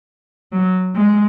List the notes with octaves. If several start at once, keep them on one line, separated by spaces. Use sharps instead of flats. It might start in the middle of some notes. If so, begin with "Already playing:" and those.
F#3
G#3